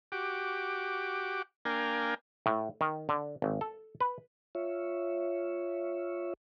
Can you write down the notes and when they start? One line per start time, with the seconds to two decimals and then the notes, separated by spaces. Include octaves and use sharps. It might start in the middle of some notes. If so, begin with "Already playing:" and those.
0.12 F#4 G4 D6
1.65 A#3 D4 A#4 F5 G5 G#5
2.46 A2
2.81 D#3
3.09 D3
3.42 G#1
3.61 A4
4.00 B4
4.55 F4 C#5 E5